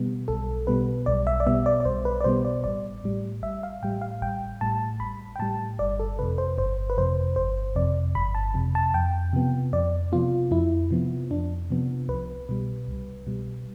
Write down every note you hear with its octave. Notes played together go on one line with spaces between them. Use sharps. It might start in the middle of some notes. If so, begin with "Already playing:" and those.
Already playing: B2 G3 B3
B1 A4
B2 G3 B3 B4
B1 D5
E5
D5
B2 G3 B3 E5
D5
D5
B1 C5
B4
D5
B2 G3 B3 C5
D5
A1 D5
A2 G3
A1 E5
F5
A2 G3 G5
F5
A1 G5
A2 G3 A5
A1 B5
G5
A2 G3 A5
G1 D5
A4
F2 C3 B4
C5
G1 C5
B4
F2 C3 C5
G1 C5
F2 C3 D5
G1 B5
A5
F2 C3
A5
F2 G5
C3 F3 B3
F2 D5
C3 F3 B3 F4
F2 E4
C3 F3 B3
F2 D4
C3 F3 B3
C2 B4
B2 G3
C2
B2 G3